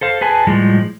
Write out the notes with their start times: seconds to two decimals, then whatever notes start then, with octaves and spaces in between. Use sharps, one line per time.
0.01 A4 C5 F5
0.21 G#4 B4 G#5 A5
0.47 A2 F3 G3 G#3